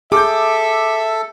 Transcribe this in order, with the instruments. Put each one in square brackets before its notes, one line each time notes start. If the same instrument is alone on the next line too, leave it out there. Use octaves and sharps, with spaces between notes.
[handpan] G#4 [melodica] A4 [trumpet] E5 [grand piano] D6 G6